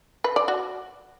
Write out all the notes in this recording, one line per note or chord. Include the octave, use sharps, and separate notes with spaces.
B4
D5
F#4